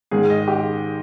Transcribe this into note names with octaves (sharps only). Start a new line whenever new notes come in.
G#2 D#3 G#3 G#4
D#5
G4